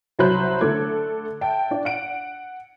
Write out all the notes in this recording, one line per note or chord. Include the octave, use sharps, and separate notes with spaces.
C2 F#3 C5 B5 F#6 G6
D3 A3 A4 D6 G#6
E5 G5 A5
D4 D5
F#5 D7